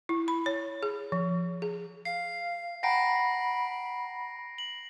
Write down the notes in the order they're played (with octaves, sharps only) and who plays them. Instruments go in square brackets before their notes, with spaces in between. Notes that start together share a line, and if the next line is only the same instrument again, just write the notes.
[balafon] E4
B5
C#5
G#4
F3
G#4
[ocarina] F5 [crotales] C7
[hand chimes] F#5 G5 A#5 [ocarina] B5 [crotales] A#6 C7 D7
[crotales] F#7